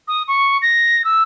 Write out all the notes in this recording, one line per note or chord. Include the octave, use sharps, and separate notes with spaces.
D#6
C#6
A#6
E6